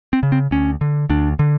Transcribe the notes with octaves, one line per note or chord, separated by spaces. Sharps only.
C4
C#3
C4
D2 C#4
D3
D2 D4
D3